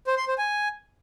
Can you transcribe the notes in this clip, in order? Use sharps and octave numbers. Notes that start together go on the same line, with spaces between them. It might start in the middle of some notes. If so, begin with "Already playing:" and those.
C5
C6
C5
G#5